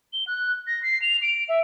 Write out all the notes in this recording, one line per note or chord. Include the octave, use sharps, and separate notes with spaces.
G7
F#6
A#6
C7
F7
D7
E5